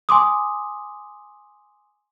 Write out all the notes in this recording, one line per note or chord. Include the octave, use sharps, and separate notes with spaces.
G#5 C6 D6 D#6